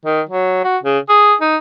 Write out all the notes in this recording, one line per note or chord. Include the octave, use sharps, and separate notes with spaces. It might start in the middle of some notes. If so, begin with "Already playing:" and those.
D#3
F#3
F#4
C#3
G#4
D#4